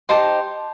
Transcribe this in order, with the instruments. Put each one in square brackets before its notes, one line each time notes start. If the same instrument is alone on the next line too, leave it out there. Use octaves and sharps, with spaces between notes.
[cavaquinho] D#4 G4 C5 A5 C6